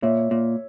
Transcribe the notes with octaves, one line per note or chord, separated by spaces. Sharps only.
A#2 C#5 E5
A#2